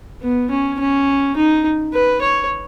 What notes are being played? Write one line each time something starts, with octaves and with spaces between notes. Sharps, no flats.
B3
C#4
C#4
D#4
B4
C#5